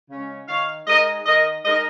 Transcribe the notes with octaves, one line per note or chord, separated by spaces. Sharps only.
C#3 G#3 C#4
D#3 C#5 F5
G#3 D#4 A#4 D#5
D#3 A#4 D#5
G#3 D#4 A#4 D#5